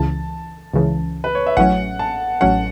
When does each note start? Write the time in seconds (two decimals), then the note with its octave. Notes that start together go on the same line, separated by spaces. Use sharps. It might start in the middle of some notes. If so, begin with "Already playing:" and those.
Already playing: C#2 C#3 E3 A5
0.74 C#2 C#3 E3
1.24 B4
1.35 C#5
1.46 E5
1.57 A1 A2 F#3 C#4 F#5
1.99 A5
2.41 A1 A2 F#3 C#4 F#5